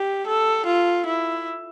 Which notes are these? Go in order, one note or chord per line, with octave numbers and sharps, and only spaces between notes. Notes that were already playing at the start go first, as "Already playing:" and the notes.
Already playing: G4
A4
F4
E4